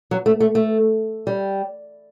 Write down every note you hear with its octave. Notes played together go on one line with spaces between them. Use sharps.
F#3
A3
A3
A3
G3